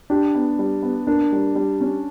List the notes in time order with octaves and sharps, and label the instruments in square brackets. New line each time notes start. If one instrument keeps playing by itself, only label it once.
[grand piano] D4 [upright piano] G4
[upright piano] B3
G3
B3
[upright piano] A#3 [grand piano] D4
[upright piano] G3
G3
C#4